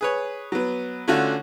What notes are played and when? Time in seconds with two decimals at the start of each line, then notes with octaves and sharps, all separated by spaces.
0.01 G#4 B4 C#5
0.52 F#3 B3
1.08 D3 A3 C#4 D4 F4 F#4